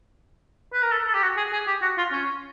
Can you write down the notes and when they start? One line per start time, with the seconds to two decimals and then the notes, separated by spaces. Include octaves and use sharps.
0.73 B4
0.82 A#4
0.91 A4
1.07 A4
1.14 G4
1.22 F#4
1.37 G#4
1.53 G#4
1.67 G4
1.82 F#4
1.98 F4
2.12 C#4